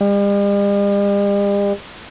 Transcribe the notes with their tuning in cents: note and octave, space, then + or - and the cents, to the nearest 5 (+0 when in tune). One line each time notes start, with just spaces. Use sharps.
G3 +45